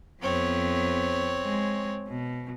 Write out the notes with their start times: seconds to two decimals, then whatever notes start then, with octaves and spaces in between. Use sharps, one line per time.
0.21 F2 B3 C4 C#5
1.43 G#3
2.08 B2